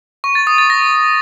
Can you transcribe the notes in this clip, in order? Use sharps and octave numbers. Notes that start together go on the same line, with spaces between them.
C#6
A6
D#6
A6
A#6